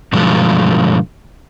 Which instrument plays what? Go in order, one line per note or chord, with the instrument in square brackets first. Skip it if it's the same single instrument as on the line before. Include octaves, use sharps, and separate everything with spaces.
[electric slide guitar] G2 B2 D3 F3 F#3 G#3